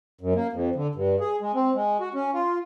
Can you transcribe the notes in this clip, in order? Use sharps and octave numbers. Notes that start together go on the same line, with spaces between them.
F#2
A#3
F2
D3
G2
G#4
G#3
C4
G#3
F#4
C#4
F4